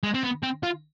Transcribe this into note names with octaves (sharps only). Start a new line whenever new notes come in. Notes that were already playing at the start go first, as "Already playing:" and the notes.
G#3
C4
B3
C4
F4